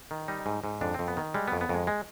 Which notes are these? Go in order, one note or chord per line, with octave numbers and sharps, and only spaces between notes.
D#3
G3 D#4
G#2
G#2
F2 D4
F2 C4
B3
D#3
G3 G#3
B3
F2
B3
F2 G#3
G#3